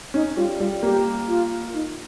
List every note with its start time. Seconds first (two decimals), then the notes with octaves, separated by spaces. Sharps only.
0.14 C#4 D#4
0.36 G3 F4
0.59 G3 F4
0.83 A#3 G4
1.28 F4
1.74 D#4